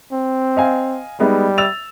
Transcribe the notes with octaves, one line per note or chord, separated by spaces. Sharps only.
C4
D#5 F5 G#5
G3 G#3 B3 D#4
E6 A6 F7